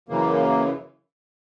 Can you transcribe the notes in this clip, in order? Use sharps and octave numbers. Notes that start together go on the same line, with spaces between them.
F#2 C#3 E3 A#3